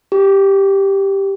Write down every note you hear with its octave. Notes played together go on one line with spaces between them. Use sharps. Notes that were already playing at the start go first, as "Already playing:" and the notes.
G4